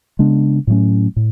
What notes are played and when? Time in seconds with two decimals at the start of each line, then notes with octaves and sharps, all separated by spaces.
0.19 C#3 G#3 B3 D4
0.67 A2 F#3 A3 C#4
1.16 A2